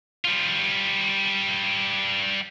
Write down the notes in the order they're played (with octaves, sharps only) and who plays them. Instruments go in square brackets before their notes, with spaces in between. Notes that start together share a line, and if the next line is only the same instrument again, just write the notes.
[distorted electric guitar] G3 F4